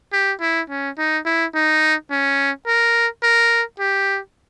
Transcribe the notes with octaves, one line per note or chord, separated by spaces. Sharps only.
G4
E4
C#4
D#4
E4
D#4
C#4
A#4
A#4
G4